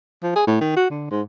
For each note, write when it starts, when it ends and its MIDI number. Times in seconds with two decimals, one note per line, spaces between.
0.23 0.34 53
0.35 0.44 68
0.47 0.60 45
0.61 0.72 51
0.76 0.88 66
0.90 1.09 50
1.11 1.22 44